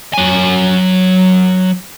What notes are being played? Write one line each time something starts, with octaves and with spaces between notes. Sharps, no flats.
F#3 G#5